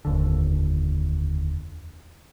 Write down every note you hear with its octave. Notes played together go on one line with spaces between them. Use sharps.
F1 D#2 D3